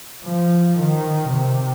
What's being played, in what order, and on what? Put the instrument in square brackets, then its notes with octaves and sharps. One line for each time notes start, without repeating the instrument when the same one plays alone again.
[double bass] F3
D#3
C3